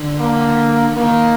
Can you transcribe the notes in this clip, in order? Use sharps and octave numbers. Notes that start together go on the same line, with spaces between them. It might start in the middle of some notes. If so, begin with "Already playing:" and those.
Already playing: D3
A#3
D#3 A#3